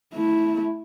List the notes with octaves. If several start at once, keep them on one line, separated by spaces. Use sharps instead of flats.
A3 E4